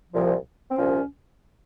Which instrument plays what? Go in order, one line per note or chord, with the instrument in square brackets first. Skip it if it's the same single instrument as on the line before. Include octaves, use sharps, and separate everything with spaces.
[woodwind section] C2 A#2 F3
C4
C2 A#2 F3 C#4